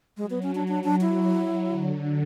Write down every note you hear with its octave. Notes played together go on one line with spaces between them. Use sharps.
F#3 G#3
B3
C#4
D4
D4
D4
E4
D3